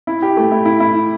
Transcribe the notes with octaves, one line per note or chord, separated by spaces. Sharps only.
E4
G4
A3
E4
E4
E4